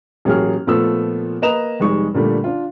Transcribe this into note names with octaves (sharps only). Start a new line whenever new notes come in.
A1 F#3 A#3 G#4 C#5 F6
A#2 F3 A3 B3 E6
A#3 B4 D#5 A#5 E7 F7
F1 G3 G#3 D#4 C#6
A#2 D3 G3 A3
D4 F4